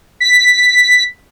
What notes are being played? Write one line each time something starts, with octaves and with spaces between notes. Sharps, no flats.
B6